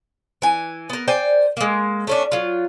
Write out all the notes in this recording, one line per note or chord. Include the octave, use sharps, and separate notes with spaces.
E3 G#5
B3 A#4
C5 D5 G5 G#5
G#3 A#3
A3 C#4 D4
F#3 F4